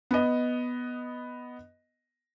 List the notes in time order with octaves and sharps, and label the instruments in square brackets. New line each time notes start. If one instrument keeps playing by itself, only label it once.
[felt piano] B3 D#5